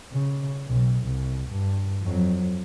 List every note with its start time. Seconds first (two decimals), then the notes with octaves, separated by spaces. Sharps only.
0.12 C#3
0.67 B1
1.05 C2
1.50 G2
2.02 F2 F#3